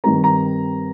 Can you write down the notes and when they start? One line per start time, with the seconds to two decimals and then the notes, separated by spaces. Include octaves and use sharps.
0.04 G2 D#3 G3 C4 A#5
0.24 A#5